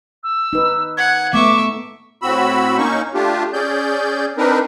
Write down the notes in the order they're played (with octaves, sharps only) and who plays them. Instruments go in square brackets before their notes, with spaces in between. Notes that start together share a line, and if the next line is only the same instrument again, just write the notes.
[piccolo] E6
[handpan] D#4 B4
[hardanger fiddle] F#5 [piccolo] G#6
[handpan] A3 B3 [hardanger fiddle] E5 C#6 [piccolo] D6
[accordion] A2 C4 F#4 B5 E6
A#3 C#4 D#4 C#6
A3 D4 F4 G4
C#4 G#4 D5 G6
C4 D4 D#4 A#4 B4